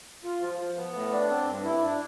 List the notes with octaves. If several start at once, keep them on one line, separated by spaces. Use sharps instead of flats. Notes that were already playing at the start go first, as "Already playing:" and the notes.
F4
F3
F3
B3
A2
D4
C4
G2
E4
D4